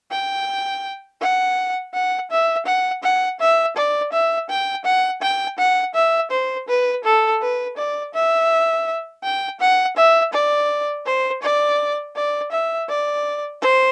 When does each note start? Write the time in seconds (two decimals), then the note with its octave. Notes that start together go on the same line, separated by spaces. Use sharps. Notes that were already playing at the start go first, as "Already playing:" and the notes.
0.11 G5
1.21 F#5
1.93 F#5
2.30 E5
2.66 F#5
3.03 F#5
3.40 E5
3.76 D5
4.12 E5
4.49 G5
4.85 F#5
5.22 G5
5.58 F#5
5.94 E5
6.31 C5
6.68 B4
7.04 A4
7.41 B4
7.77 D5
8.14 E5
9.23 G5
9.60 F#5
9.96 E5
10.33 D5
11.05 C5
11.42 D5
12.15 D5
12.51 E5
12.89 D5
13.62 C5